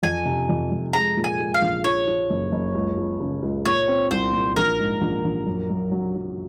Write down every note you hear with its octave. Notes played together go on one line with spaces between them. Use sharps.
F2 G#5
C3
F2
F2
G#3 A#5
A#2
G#5
G#3
F5
A#1
F3 C#5
F3
F#1
F#1
C#2
C#2
C#3
C#2
A#2 C#5
C4
C2 C5
A#2
A#1 A#4
G#2
A#1
A#1
F#2
F#2
F#3
F#3